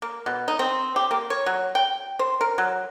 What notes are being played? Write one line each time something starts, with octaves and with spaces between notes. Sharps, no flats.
A#3
B2
D#4
C4
G4
A#3
C#5
F#3
G5
C5
A#4
F#3